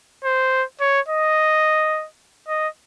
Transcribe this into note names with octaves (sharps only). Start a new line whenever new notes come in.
C5
C#5
D#5
D#5